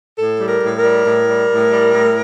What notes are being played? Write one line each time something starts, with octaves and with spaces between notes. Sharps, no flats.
A2 A4
G3
A#4
A2
A#4
G3
A2
G3
A2
G3
A2